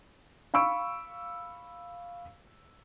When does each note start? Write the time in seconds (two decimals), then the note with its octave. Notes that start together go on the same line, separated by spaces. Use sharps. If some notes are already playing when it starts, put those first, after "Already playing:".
0.54 F5 B5 C#6 E6 D7